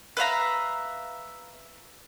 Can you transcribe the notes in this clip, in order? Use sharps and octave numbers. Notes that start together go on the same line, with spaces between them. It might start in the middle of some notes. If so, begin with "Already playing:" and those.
B4 E5 F5 A#5